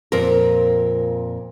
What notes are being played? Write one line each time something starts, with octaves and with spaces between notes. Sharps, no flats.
F2 A#2 C4 A#4